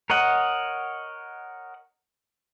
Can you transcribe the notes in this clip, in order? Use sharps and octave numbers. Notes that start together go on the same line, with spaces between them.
A#4 C#5 D#5 F#5